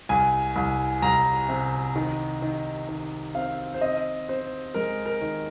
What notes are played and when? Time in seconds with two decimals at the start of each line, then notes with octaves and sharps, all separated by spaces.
0.09 C2 G#5
0.56 C2
1.02 C2 A#5
1.49 C3
1.96 D#3
2.42 D#3
2.89 D#3
3.35 C4 F5
3.74 C5
3.81 C4 D#5
4.29 C4 C5
4.74 G#3 A#4
5.05 A#4
5.22 D#3